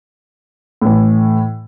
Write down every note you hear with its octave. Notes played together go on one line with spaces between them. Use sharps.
A2 E3